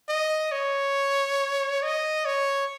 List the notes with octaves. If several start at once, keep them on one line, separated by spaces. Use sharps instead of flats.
D#5
C#5
D#5
C#5